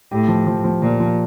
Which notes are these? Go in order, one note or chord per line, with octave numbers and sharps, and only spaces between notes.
A2 G4
F3
F3
F3
A#2 F3
F3